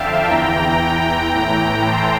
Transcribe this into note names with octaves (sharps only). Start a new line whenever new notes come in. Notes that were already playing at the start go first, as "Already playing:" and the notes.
Already playing: F2 D3 E5 F5 G5 A5
E2 E3 G5 A#5
G5 A#5
A2 E3 G5 A#5
A5 C6